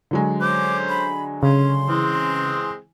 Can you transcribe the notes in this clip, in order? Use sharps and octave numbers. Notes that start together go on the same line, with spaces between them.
D3 F#3 G#3
C#4 C5 D6
B5
C#3 C#4 C6
E3 G#3 C4